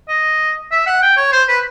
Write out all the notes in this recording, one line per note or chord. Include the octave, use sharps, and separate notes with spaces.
D#5
E5
F#5
G5
C#5
C5
B4